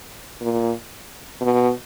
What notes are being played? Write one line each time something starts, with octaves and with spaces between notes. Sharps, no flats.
A#2
B2